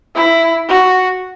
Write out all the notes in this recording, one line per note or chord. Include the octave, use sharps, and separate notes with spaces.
E4
F#4